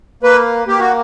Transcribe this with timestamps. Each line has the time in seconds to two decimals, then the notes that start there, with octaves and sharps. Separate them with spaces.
0.23 A#3 B4
0.68 A#3 G4
0.80 F#4